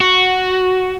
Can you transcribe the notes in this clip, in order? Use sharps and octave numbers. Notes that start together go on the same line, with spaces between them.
F#4